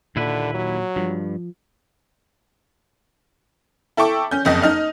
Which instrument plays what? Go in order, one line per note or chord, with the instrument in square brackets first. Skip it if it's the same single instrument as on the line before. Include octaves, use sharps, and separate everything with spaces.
[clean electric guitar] D#2 E4 B4 [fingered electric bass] A#2 [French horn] D3
[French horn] F#3
[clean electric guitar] G2 [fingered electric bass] F3
[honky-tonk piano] E4 A4 G5 C#6 D6
C#4 G6
F#1 F2 D#5
D#4 D#5 F6